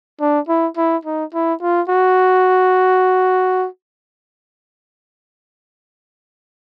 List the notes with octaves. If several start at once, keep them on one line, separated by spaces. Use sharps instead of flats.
D4
E4
E4
D#4
E4
F4
F#4